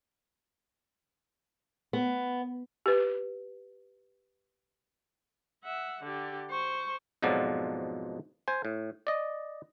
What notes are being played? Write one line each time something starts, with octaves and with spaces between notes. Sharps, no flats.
B3
G4 B4
E5 F#5
D3 G4
C5 C#6
F2 G#2 B2 F3 F#3 D5
C5 G#5
A2
D5 D#5